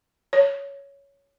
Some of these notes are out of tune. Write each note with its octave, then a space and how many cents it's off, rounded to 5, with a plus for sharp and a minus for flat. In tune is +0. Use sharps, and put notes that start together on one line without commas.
C#5 +10